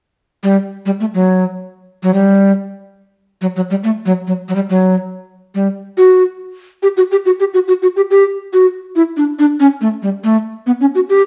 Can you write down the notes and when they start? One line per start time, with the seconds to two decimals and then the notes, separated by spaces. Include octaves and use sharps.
0.43 G3
0.86 G3
1.00 A3
1.14 F#3
2.03 F#3
2.14 G3
3.41 F#3
3.56 F#3
3.70 G3
3.84 A3
4.06 F#3
4.27 F#3
4.49 F#3
4.55 G3
4.70 F#3
5.55 G3
5.97 F#4
6.83 G4
6.97 F#4
7.11 G4
7.26 F#4
7.40 G4
7.54 F#4
7.68 F#4
7.82 F#4
7.96 G4
8.11 G4
8.53 F#4
8.96 E4
9.17 D4
9.39 D4
9.60 C#4
9.81 A3
10.03 G3
10.24 A3
10.66 B3
10.81 C#4
10.95 F#4
11.09 G4